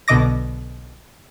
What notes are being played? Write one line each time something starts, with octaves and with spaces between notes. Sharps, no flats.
B1 B2 D3 D#5 D6 A#6